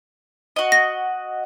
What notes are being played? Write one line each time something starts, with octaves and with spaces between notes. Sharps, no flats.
F#4 D#5
A#6